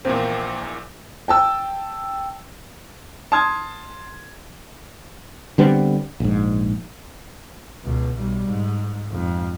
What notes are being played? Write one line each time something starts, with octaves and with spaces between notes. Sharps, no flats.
A#1 E2 A#2 A#3 C4
G5 A5 E6
A5 C6 D#6 F6 G#6
D3 G3 B3 C4
A#1 G#2
C#2 B2
B1 G3
G#2
F2 G#2